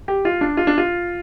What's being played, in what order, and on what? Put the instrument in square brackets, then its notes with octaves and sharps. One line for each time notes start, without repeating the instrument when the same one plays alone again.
[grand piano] G4
F4
D4
F4
D4
F4